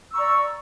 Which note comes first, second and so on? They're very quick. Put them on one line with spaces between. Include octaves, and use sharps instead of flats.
E6 C#6 A#5 D5